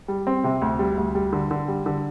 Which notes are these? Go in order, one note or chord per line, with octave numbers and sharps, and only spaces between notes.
G3
C4
C3
D2
G3
D2
G3
D3
D3
G3
D3